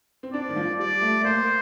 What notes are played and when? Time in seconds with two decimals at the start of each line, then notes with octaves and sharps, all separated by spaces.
0.23 C4
0.33 D4 D5
0.49 D#3
0.56 F3
0.79 G3 D5
1.01 A3
1.20 A3
1.24 A#3 C5